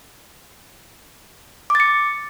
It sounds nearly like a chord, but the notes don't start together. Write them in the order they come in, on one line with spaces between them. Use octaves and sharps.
D6 A6 C#7